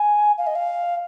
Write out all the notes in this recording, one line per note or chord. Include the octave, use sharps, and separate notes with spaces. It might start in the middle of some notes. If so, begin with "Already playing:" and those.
Already playing: G#5
F5
D#5
F5